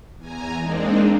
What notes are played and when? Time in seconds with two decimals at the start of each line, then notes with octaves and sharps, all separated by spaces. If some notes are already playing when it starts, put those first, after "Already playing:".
0.17 E2 G#5 A#5
0.59 G#3 A#3 C4 D4 D#4